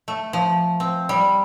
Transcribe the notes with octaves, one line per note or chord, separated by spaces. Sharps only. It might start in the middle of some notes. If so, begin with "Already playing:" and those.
A3
F3
C4
G3